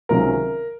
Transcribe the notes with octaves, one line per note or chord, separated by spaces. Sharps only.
C#2 C3 D#3 F#3 C#4 A#4